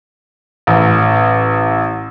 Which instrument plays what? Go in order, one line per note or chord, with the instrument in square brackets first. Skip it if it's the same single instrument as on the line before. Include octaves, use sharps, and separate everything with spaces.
[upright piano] A1